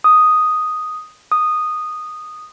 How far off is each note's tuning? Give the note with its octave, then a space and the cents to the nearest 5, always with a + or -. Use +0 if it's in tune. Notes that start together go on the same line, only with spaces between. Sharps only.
D#6 +0
D#6 -10